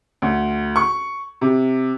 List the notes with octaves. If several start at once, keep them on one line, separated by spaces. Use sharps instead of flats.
D2
C#6
C3